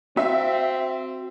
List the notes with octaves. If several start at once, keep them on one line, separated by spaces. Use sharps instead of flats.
C4 F#4 C5 E5 F5